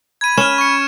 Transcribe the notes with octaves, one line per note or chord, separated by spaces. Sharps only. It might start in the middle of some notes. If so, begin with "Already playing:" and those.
B5 G#6 D#7
C#4 F6 E7
C#6 C#7